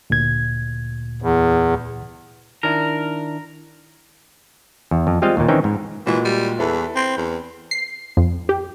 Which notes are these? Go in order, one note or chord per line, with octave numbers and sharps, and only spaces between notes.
D2 A#2 G#6
E2
D#3 D4 E4 A#4
E2
F2
G3 G#3 C4 F4 D#5 F5
D#2 A#2
D#3 E3 C4 C#4 D#4 G5
G#2
A#2 E3 G#3 F#4
G3
E2 E4 A4 B4
C4
E2
C7
F2
G4